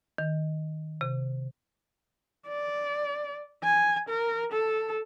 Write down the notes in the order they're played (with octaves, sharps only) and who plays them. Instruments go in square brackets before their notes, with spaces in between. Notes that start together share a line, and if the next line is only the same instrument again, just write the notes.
[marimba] D#3
C3
[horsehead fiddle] D5
G#5
A#4
A4